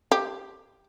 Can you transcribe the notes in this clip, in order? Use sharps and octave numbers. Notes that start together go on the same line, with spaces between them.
G4